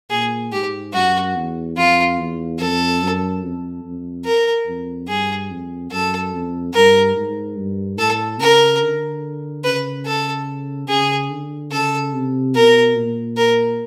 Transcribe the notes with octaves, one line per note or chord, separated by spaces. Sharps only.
A#2 G#4
G#2 G4
F#2 F#4
E2
F2 F4
E2
F2 A4
F#2
F2
F2
A#4
F2
G2 G#4
F2
F#2 A4
F2
G2 A#4
G#2
G2
A2 A4
C#3 A#4
D3
C#3 B4
A4
C#3 G#4
D3
C#3 A4
C3
B2 A#4
A#2
A#4